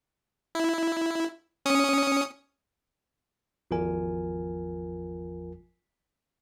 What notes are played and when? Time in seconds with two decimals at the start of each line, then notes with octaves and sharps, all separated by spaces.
0.55 E4
1.65 C#4 D#6 C#7
3.71 G#1 E2 F3 F4 A#4 G#5